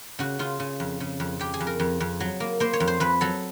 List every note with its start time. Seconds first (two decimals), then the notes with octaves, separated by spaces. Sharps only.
0.19 C#3 F#4
0.39 C#3 F4
0.60 C#3
0.80 F2
1.00 C#3
1.20 F2
1.39 F2 G4
1.54 G#4
1.60 F2
1.67 A#4
1.80 F2
2.00 F2
2.20 F#3
2.40 A#3
2.60 A#3 C5
2.73 C#5
2.80 F2
2.88 C5
3.00 F2 B4
3.21 F#3 A4